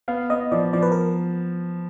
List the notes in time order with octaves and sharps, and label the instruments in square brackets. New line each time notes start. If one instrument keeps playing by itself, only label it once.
[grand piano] B3 [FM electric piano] F5
[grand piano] B3 [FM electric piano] D#5
[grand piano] F3 [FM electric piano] D5
[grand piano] F3 [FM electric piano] D5
[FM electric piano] B4
A#4